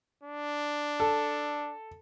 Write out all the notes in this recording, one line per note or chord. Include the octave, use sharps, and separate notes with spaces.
D4
A4